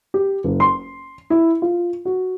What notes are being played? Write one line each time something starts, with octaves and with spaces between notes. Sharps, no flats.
G4
F#1
C6
E4
F4
F#4